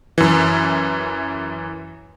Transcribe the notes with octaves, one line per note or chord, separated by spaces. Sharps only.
F#2 E3